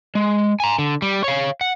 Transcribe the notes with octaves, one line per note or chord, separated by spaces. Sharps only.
G#3
G#5 A#5
D3
G3
C#5 F5
F#5